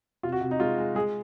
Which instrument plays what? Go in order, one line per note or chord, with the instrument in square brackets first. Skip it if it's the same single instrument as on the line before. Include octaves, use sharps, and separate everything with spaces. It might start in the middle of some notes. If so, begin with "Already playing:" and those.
[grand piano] C3 F4
F#4
C3
D#4
G#3 F4
G#3
G#3 G#4